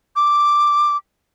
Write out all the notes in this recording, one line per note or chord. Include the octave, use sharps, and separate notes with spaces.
D6